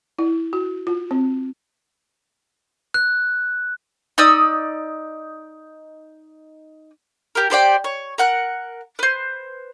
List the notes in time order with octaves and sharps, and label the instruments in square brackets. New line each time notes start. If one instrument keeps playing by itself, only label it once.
[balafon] E4
F#4
F4
C4
[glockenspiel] F#6
[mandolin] D#4 D5 D#6 E6
G4 A#4
G4 C5 D5 G5
C#5
A#4 F#5 F#6
B4 C5